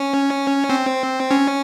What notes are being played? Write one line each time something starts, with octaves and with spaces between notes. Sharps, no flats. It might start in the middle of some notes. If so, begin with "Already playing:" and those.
Already playing: C#4
C4
C#4